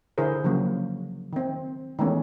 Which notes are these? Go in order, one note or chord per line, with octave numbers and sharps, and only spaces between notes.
D3 E4 G#4 A#4 C5
C#3 F3 F#3 A#3
D#3 C4
D#3 E3 G#3 A3 B3 C#4